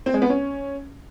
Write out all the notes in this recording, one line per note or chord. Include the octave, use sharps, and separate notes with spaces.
C4
G#3
B3
C#4